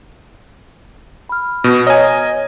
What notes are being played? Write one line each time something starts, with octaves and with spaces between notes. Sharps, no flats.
B5 F6
B2
C#5 D#5 G#5 A#5 F6